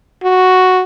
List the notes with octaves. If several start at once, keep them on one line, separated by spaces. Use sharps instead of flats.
F#4